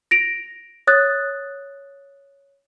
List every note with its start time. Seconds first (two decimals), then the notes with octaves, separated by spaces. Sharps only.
0.11 A#6 D7 F7
0.87 C#5 D#6 F#6 A6